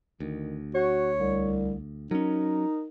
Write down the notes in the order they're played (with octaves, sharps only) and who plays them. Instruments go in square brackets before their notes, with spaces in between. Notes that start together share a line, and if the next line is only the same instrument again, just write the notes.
[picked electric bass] D2 [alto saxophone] D#3
[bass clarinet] F#4 [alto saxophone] C#5
[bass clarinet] C2
[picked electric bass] F#3 C#4 [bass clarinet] D#4 [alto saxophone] A#4